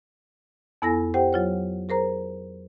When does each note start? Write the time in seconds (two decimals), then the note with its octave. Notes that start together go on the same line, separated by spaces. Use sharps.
0.82 F2 B3 E4 A4 G#5 A#6
1.14 G4 C5 F#5 G5
1.33 F#3 F4 C#5
1.89 G#4 A#4 C5 A#5